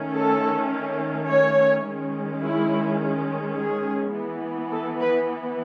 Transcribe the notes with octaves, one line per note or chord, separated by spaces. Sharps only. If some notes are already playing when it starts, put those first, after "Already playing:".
Already playing: D#3 A3 C#4
A4
C#5
D#3 G#3 C#4
E4
G#4
E3 B3
A4
B4